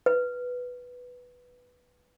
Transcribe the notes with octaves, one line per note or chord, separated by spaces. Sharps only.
B4